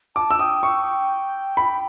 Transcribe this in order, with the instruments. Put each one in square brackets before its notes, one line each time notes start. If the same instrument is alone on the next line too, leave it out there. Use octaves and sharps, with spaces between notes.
[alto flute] A5 [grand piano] D6
[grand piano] E6
[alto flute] G5 [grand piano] D#6
[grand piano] C#6
B5